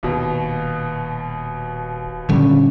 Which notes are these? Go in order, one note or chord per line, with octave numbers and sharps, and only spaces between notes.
D#1 D#2 B2
A#2 D3 G3 C#4